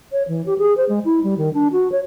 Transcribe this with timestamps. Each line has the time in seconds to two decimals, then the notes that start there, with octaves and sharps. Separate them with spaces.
0.12 C#5
0.28 E3
0.46 G4
0.58 G#4
0.77 C5
0.89 G#3
1.05 E4
1.24 G3
1.38 D#3
1.54 D4
1.73 F#4
1.92 C#5